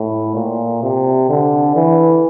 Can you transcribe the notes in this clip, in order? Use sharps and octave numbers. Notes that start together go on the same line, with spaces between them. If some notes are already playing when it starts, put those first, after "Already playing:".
Already playing: A2
A#2
C3
D3
E3